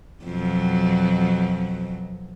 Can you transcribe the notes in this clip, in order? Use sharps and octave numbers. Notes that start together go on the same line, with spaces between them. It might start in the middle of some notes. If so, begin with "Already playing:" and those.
F2 B2 F#3